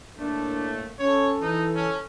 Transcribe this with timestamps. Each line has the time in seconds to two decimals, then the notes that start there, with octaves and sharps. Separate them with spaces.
0.18 A2 A3 A#3 D4
0.99 C#4 A4 C#5
1.41 E3 D#4
1.75 C#4